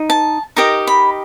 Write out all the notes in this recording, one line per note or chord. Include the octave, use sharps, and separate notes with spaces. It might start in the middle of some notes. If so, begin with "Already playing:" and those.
Already playing: D#4
A5
D#4 G4 A#4 D#5 A#5
B5